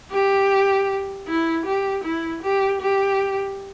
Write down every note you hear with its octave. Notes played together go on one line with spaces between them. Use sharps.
G4
E4
G4
E4
G4
G4